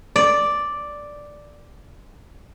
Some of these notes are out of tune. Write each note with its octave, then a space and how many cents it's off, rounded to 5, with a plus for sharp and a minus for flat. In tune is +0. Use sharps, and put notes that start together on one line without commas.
D5 +0